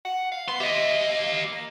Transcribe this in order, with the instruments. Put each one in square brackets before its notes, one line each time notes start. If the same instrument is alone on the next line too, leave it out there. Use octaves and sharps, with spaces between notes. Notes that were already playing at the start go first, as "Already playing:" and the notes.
[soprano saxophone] F#5
F5
[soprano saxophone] B3 [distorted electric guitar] C6
[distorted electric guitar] G4 D#5 [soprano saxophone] E5
[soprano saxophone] F5
A#3